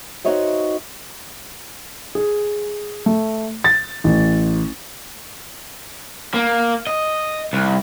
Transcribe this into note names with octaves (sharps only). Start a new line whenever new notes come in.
D#4 F#4 C5 C#5 D#5 E5
G#4
A3
A6
A1
A#3
D#5
C2